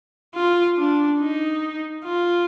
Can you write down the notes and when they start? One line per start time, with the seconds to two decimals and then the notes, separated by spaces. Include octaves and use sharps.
0.35 F4
0.77 D4
1.20 D#4
2.04 F4